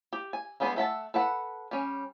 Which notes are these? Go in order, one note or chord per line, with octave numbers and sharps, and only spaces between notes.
G4
G#5
G3 G#3 B3 D4 G#4
A3 E5 F#5 A5
A4 B4 F#5
G3 C#4